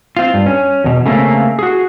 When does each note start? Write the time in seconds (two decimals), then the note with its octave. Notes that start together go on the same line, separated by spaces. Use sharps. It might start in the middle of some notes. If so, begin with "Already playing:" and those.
0.17 C4 F4
0.34 G2
0.46 C#4
0.84 E2 B2
1.06 C#3 A3 A#3 C4 C#4
1.59 F#4 G#4